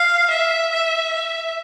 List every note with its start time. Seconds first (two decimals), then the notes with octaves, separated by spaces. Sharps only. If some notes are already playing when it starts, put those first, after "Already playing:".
Already playing: F5
0.30 E5
0.73 E5
1.14 E5